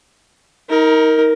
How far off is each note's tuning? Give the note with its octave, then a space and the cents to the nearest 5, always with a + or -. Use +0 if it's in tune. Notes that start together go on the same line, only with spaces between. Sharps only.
D#4 +30 A#4 +0